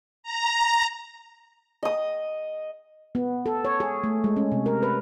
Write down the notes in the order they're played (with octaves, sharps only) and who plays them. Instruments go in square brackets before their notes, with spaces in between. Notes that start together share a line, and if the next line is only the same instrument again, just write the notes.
[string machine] A#5
[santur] D#5 D#6
[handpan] B3
A4
C#5
G#4
A3
G#3
C#4
C3
A#4
B4